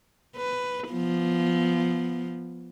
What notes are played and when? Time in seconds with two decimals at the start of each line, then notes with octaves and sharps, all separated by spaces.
0.37 B4
0.90 F3 B3